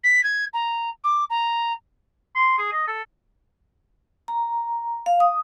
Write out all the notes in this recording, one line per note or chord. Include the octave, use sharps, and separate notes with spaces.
B6
G#6
A#5
D6
A#5
C6
G#4
D#5
A4
A#5
F5
D#6